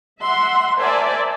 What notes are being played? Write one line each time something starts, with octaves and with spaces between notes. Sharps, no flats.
E5 F#5 C6
A#4 C5 D5 E5 G#5 A5